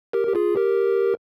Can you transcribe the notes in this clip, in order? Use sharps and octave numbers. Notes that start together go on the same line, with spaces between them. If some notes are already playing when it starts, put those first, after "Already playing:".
G4 A#4
G4
F4 G#4
G4 A#4